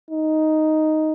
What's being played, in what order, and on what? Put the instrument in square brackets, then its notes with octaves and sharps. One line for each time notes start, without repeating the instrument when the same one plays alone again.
[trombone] D#4